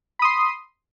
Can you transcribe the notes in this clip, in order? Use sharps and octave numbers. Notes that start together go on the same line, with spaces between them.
B5 C6 D#6